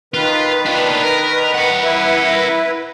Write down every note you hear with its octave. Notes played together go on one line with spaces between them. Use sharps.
D#3 F4 B4
D4 F4
A#4
A#4 F#5
E4 B4